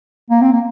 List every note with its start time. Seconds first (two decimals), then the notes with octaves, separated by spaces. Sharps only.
0.30 A#3
0.41 C4
0.52 A#3